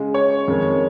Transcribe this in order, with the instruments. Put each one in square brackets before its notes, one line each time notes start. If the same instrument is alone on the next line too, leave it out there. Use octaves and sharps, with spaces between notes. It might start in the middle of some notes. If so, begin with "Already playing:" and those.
Already playing: [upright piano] C#3 G#3
C#5
F2 D#3 G#3